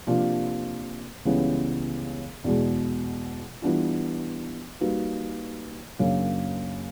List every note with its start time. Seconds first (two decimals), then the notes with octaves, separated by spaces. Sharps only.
0.07 C3 F3 A#3 D4 F4
1.25 C#2 C#3 E3 G3 B3
2.44 E2 B2 G#3
3.62 E3 G3 B3 D4 F4
4.81 G3 A#3 D#4 F#4 B4
5.99 F#2 C#3 F#3 A#3 D4